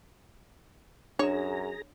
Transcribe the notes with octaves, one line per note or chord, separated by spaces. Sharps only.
F#2 D4 G#4 C#5 A#5 D#6 E7